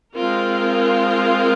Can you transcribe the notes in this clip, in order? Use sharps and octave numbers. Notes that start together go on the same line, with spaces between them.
G#3 C4 F4 A#4